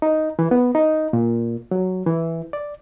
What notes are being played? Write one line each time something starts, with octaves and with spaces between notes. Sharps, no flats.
D#4
E3
B3
D#4
A#2
F#3
E3
D5